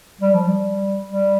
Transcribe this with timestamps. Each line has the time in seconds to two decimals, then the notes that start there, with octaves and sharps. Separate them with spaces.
0.21 G3
0.35 F3
0.49 G3
1.06 G3